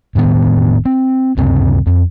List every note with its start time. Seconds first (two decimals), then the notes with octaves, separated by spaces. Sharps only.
0.15 E1 A2 D#3 B3
0.85 C4
1.37 C#2 F#2 C3 C4
1.86 F2